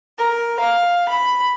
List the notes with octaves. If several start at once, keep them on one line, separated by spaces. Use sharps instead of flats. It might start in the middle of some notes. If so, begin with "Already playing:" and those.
A#4
F5
B5